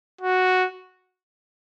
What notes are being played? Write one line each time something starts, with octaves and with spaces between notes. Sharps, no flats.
F#4